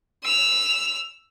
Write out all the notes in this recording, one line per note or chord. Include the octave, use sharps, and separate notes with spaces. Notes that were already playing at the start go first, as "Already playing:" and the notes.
E6 F7